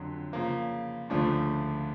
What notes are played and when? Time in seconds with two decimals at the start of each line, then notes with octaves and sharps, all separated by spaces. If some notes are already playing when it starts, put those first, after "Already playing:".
Already playing: F2 D3 F#3
0.33 C#3 F3 A#3
1.10 D2 C#3 F3 A3 D4